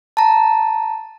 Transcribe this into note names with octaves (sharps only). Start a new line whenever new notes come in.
A5 A#5